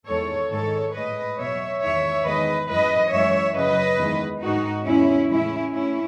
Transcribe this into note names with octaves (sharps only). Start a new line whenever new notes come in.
E2 D#3 G#3 A4 C#5
G#2 D#3 G#3 A4 C#5
A2 G#3 B4 D#5
E2 B2 F#3 C#5 E5
E2 D#3 G#3 C#5 E5
E2 D#3 G#3 B4 D#5
F#2 E3 G#3 B4 D#5
F#2 E3 G#3 C#5 E5
F#2 C#3 F#3 B4 D#5
E2 D#3 G#3
G#2 D#3 G#3 D#4 F#4
E2 C#3 G#3 C#4 E4
A2 E3 G#3 C#4 E4
A2 C#4 E4